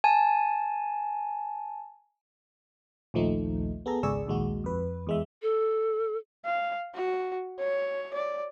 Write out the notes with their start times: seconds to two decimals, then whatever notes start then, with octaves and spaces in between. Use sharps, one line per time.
0.04 G#5 A5
3.14 A#1 D#2 F3 A3 D#4
3.86 B3 G#4 A4 A#5
4.03 G#1 C#2 G#4 D5 C#6 E6
4.27 A#1 D#2 G#3 F#4
4.64 F2 B4
5.07 E2 G#3 E5
5.42 A4
6.45 F5
6.94 F#4
7.59 C#5
8.14 D5